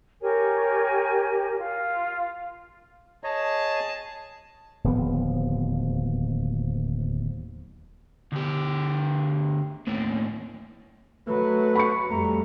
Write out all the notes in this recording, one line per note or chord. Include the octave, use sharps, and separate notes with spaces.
G4 A#4 C#5 G#5
F4
G#4 C#5 D#5 A5
D1 D#2 F3 B3
D2 G4
D#2 A2
F#3 A3 B4
B5 C#6 C#7
F2 G3 A3 A#5